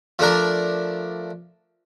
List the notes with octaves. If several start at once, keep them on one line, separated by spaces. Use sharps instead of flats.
F3 A3 D4 A#4